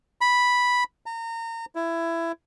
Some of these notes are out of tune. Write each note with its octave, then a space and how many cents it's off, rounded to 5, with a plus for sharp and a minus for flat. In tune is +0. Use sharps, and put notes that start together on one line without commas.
B5 -5
A#5 -30
E4 +15